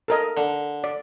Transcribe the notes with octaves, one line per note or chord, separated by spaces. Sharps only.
A4 A#4 D#5
D3
D5